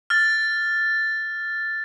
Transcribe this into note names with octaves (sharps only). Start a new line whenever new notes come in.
F6 A6